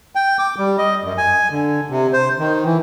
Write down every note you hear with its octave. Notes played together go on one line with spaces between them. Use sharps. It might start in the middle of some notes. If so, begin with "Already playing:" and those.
G5
D6
G3
D#5
F#2
G#5
D3
C3
C5
D#3
E3